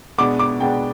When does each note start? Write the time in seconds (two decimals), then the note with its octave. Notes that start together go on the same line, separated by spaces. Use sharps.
0.18 B2 G#3 B3 D4 D6
0.39 D6
0.60 B2 G#3 B3 D4 G5